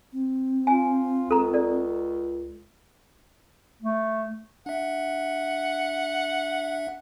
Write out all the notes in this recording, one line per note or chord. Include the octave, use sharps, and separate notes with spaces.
C4
F4 G#5
C#2 A4 A#5
A4 D5
A3
D4 E5 F#5